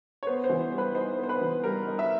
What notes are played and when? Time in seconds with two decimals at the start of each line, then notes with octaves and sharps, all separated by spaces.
0.23 C#5
0.27 B3 C5
0.44 C5
0.50 E3
0.60 C5
0.72 G3
0.78 B4
0.95 D#4 C5
1.19 B3 C5
1.29 B4
1.41 E3
1.64 G3 A#4
1.87 D#4
1.99 E5